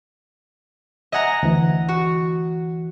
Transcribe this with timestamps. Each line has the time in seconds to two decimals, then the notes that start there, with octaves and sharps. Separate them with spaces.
1.12 D#5 E5 F#5 G#5 A#5
1.43 D2 E3
1.88 F#4